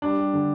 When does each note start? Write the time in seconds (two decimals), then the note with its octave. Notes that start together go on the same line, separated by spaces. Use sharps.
0.02 G3 D4
0.18 G3
0.33 D3